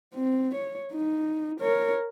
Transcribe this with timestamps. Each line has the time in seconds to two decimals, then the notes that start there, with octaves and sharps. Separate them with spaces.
0.14 C4
0.55 C#5
0.93 D#4
1.60 A#4 C#5